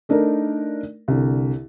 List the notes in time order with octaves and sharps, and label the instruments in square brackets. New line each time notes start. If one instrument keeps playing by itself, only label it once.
[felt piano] A3 D4 D#4 A#4
C2 D3